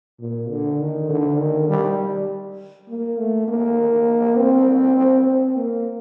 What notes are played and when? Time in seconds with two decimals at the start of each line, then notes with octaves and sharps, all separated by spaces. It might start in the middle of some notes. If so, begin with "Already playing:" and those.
0.20 A#2
0.49 D3
0.80 D#3
1.09 D3
1.39 D#3
1.69 G3
1.99 G3
2.88 A#3
3.18 A3
3.48 A#3
4.37 C4
4.96 C4
5.27 C4
5.56 A#3